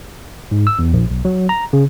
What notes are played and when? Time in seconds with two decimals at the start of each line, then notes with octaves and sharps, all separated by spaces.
0.51 G#2
0.67 E6
0.79 E2
0.93 A#1
1.11 B1
1.25 F#3
1.49 A#5
1.73 C#3